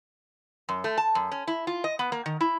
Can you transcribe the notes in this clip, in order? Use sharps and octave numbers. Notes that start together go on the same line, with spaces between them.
F#2
A3
A5
F#2
C#4
E4
F4
D#5
B3
A#3
D#3
E4